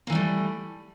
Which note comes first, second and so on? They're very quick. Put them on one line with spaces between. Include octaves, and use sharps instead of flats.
A#3 E3 G3 A3